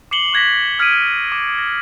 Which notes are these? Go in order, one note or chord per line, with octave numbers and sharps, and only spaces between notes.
D6 C7 C#7 F#7 G7
C#6 F#6 G#6 A#6 B6
D#6 F6 G#6 B6 D7 D#7
D6
A#6